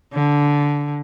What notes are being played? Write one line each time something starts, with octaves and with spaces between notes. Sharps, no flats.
D3